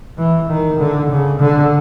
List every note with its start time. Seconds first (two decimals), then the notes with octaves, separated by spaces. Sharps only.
0.18 E3
0.49 D#3
0.79 D3
1.09 C#3
1.40 D3